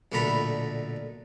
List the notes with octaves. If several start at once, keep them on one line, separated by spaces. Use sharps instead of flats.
B1 A#2 D3 A3 A#5 B5